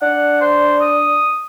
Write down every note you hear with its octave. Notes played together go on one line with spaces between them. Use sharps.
D4 F#5
C5
D#6